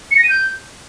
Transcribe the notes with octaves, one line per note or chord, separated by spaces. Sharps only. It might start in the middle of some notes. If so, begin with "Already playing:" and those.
C#7
A#6
D#7
G6